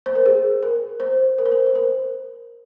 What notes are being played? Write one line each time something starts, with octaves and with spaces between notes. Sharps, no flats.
C5
A#4
G#4
A#4
C5
A#4
C5
A#4
C5
A#4